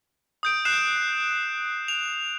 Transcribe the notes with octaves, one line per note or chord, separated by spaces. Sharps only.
D#6 G6 D7
F#6 C7 E7
F7